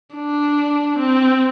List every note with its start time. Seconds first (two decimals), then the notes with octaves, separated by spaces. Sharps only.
0.16 D4
0.99 C4